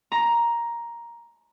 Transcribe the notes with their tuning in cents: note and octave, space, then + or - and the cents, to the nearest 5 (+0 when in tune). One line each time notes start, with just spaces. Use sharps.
A#5 +10